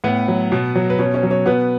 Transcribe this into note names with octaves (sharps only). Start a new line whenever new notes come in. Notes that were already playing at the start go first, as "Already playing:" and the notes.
A2 B3 B4
F#3
B2
F#3
B4
B2 C#4 C#5
C#4 C#5
F#3
C#4 C#5
B2 B3 B4